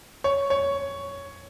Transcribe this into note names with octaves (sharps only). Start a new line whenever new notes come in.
C#5
C#5